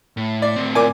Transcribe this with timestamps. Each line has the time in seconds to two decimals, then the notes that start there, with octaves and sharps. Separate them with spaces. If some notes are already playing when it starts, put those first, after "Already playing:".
0.17 A2
0.42 D5
0.56 A2 C4
0.75 A#2 G#5 D6